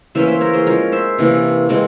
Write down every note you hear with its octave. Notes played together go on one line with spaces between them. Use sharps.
E3 A#3 C#4 C5 E5
C5 E5
A#4 C#5
G#4 C5
F3 G#3 C#4 A#4 C#5
C5 E5
C3 E3 A#3 C#4
C3 E3 G#3 C4